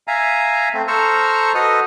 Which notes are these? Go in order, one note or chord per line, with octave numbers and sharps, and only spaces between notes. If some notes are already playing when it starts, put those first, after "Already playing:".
E5 F5 G#5 A#5
A3 C4
A4 C5 A#5 C#6 E6 F6
F#4 A4 B4 D#5 D#6 F6